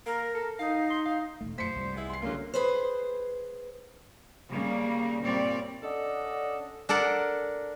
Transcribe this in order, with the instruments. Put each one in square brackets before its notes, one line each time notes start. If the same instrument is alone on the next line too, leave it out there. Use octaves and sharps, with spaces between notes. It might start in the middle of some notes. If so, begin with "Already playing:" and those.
[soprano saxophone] A#3 [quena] A#4
[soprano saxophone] A4
[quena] D#4 [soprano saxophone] F5
[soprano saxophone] C6
F5
[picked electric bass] E1 D#2 A3
[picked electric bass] F#2 A3 [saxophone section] F3 C5 [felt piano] B6 C#7
[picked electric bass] C2 G3
[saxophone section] G#3 B3 E4
[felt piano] C6 C7
[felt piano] D3 F#3 A#3 [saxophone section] G#3 F4
[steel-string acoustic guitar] G#4 B4 C5
[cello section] C#3 G3 A#3
A#2 G3 C4 C#5 D5
[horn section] C#4 D4 A4 D5 D#5 F#5
[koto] D4 A4 A#4 D5 F#5